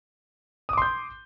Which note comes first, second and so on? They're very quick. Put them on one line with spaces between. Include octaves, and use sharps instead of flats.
D#6 D6 C6 G6